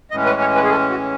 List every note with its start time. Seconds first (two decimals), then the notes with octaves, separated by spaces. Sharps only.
0.11 A2 E3 G#3 C#4 D#5
0.26 B4
0.41 C#5
0.55 B4
0.64 G#4
0.70 A4
0.90 F#4